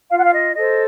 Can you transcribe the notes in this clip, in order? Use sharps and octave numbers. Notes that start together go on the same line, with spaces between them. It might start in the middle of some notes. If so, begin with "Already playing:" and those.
F4 F5
F#5
F5
D#5
A4 C5 D#5